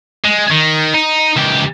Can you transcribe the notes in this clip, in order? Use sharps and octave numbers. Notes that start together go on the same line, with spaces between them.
G#3
D#3
D#4
C#2 G4